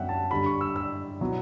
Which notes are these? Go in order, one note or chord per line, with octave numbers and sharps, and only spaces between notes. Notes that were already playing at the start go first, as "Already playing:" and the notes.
Already playing: F#2 D3 G3 B3 E5 F#5 G5
A5
G2 D3 G3 B5
C#6
E6
E6
B2 F#3 B3 E4